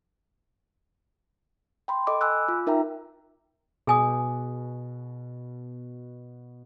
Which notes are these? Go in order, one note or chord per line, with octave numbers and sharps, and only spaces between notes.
G5 B5 C6
A4 D#5 D6
G#5 B5 D6 E6 F#6
F4
D#4 A#4 E5 G5 A#5
B2 G#4 G#5 D#6